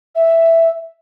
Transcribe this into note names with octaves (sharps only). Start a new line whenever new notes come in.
E5